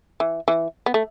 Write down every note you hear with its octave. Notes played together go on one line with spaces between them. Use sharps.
E3
E3
B3
A3